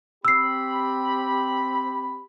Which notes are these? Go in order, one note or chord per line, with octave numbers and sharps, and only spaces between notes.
C4 G4 B5 E6 C7